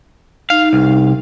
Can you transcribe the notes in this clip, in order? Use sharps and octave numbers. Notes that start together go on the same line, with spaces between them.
D#4 F5
C2